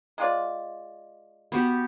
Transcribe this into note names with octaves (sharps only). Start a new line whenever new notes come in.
G#3 F4 D5
B3 F#4 G4